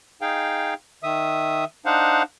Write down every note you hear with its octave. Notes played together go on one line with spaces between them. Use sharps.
D#4 G#4 F5 G5
D#3 E5 D#6
D4 D#4 C5 F5 F#5